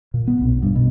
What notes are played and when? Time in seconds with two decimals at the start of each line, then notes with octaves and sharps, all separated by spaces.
0.14 A#2
0.27 B3
0.41 B1
0.62 G2
0.75 B2